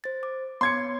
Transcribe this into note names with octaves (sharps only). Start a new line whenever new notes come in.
C5 A6
D6
B3 C#5 C6 G#6 C#7